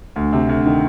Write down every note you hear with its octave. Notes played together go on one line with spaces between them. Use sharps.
D2
C3
D2
D#3